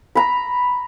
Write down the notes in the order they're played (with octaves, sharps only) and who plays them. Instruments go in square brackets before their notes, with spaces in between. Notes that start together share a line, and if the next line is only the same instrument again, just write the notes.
[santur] A#5 B5